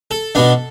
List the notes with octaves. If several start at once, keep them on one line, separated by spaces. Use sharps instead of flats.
A4
B2 B3 D4